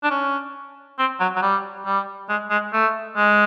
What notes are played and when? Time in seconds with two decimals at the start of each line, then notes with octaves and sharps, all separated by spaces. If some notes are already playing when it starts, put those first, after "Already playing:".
0.04 D4
0.10 C#4
0.99 C4
1.20 F#3
1.36 F#3
1.42 G3
1.86 G3
2.29 G#3
2.50 G#3
2.73 A3
3.17 G#3